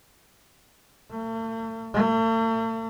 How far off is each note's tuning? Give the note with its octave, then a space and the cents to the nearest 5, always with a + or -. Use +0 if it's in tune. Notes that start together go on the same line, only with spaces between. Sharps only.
A3 +40
A3 +45